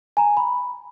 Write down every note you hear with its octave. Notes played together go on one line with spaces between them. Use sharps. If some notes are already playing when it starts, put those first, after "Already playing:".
G#5 A#5
B5